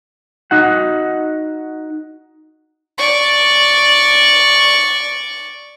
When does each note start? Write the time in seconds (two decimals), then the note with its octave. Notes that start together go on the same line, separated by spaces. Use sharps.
0.51 D#4 F#4 F#5
2.98 D5 C#6